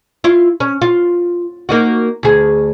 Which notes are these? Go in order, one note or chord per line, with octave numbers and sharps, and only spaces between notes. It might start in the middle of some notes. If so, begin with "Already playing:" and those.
E4 F4
C#4
F4
A#3 D#4 F#4
D2 G#4